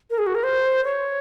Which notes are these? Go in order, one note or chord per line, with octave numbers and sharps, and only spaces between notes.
A#4
G#4
F#4
A#4
C5
C#5